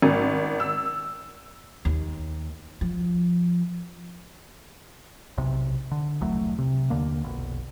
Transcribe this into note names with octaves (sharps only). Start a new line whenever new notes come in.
G#1
E6
D#2
F3
B1 C3
D3
E1 C2 F#3 A3
C3
D#2 D3 A#3
F1 B1